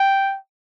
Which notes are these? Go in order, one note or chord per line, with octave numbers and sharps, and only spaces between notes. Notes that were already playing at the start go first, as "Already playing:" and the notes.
Already playing: G5